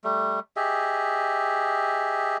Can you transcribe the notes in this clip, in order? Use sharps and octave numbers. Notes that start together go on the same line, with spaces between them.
G3 A3
G4 G#4 D#5 E5